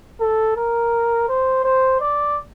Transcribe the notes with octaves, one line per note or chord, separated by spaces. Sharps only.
A4
A#4
C5
C5
D5